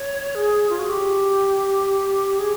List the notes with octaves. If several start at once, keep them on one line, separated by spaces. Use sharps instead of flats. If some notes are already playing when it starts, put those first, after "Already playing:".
Already playing: C#5
G#4
F4
F#4
G4
G#4